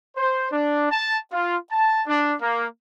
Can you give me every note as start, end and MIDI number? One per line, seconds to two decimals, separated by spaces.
0.17 0.49 72
0.52 0.88 62
0.91 1.18 81
1.32 1.57 65
1.72 2.02 81
2.07 2.33 62
2.41 2.67 58